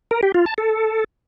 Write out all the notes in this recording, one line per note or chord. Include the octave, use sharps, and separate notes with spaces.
A#4
G4
F4
A5
A4